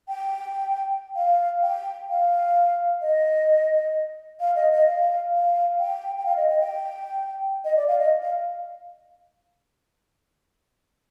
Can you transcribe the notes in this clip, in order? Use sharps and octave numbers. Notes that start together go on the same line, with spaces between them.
G5
F5
G5
F5
D#5
F5
D#5
D#5
F5
F5
G5
G5
F5
D#5
D#5
G5
D#5
D5
F5
D#5
F5